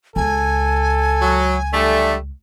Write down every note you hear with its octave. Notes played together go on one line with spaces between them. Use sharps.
C#2 A4 G#5
F#3
D3 G3 A3 D5